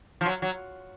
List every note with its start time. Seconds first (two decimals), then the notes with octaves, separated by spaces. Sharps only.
0.21 F3
0.26 F#3
0.42 F#3